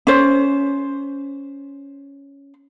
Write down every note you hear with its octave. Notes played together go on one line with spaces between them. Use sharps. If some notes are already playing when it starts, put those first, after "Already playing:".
C#4 C5